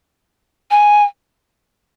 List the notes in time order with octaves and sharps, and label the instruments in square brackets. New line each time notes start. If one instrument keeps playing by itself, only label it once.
[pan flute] G#5